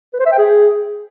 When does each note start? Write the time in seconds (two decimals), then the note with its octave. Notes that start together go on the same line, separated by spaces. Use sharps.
0.13 B4
0.20 C5
0.26 E5
0.32 G5
0.38 G#4